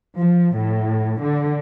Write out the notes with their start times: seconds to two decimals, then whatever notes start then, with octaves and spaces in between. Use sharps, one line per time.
0.17 F3
0.55 A2
1.19 D3